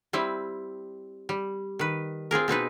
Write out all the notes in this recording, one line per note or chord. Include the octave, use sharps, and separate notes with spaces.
G3 C4 E4
G3
D#3 B4
C4 F4 G#4 A#4
B2 C4 D#4 B4